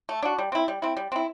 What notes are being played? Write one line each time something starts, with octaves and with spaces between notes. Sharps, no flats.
A3
D4 F#4
G3
C4 E4
G3
C4 E4
G3
C4 E4